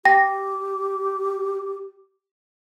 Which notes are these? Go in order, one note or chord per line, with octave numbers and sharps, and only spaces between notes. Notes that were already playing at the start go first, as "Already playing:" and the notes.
G4 G5 A#6